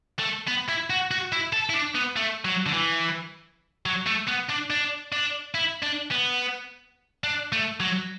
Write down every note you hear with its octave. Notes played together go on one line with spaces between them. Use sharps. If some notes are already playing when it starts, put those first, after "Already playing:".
A3
B3
E4
F#4
F#4
E4
A4
E4
D4
B3
A3
F#3
D3
E3
F#3
A3
B3
D4
D4
D4
E4
D4
B3
D4
A3
F#3